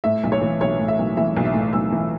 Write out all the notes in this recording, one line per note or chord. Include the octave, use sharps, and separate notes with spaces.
A2 E5
B1
C#5
E3
B1 C#5
A2
E5
B1
E3 E5
B1
E5
A2
B1 E6
E3